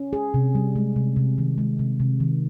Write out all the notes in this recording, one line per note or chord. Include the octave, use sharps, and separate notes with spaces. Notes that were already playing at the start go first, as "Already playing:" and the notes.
Already playing: C#4
G#4
C3
G3
G#3
C3
C3
D#3
G#3
C3
C3
D#3